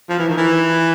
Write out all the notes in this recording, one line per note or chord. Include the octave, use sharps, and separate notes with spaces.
F3
E3
D#3
E3